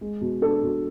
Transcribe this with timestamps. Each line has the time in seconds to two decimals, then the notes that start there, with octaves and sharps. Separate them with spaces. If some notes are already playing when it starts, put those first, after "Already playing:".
0.01 G#3
0.21 B2
0.42 D4 A4
0.63 B2